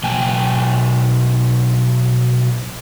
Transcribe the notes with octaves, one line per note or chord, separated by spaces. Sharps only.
B2 F#3 G5 G#5